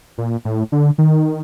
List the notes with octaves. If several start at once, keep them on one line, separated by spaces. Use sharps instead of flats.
A#2
A2
D3
D#3